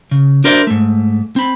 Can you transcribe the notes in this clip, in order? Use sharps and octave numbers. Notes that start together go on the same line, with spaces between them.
C#3
D4 F#4 A#4 C5 D5 E5
G#2 A3
C4 B5